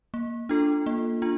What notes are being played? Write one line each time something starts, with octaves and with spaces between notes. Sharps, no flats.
A#3
D4 F4 A4
A#3
D4 F4